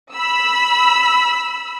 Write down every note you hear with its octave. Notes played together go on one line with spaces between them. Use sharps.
B5 E6